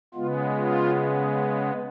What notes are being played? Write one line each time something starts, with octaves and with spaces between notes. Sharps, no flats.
C#3 G#3 B3 F4
F4